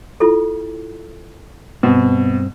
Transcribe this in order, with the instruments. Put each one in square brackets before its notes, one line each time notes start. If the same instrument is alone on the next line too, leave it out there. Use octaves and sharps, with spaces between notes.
[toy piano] E4 F4 A4
[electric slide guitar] G2 C4 [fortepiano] B2